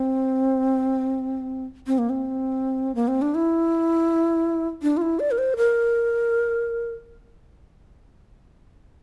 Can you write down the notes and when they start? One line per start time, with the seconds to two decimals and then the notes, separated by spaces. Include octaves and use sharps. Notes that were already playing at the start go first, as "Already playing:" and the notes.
Already playing: C4
1.87 C4
1.98 A#3
2.10 C4
2.95 A#3
3.08 C4
3.22 D4
3.35 E4
4.83 D4
4.97 F4
5.02 E4
5.20 D5
5.31 A#4
5.38 C5
5.57 A#4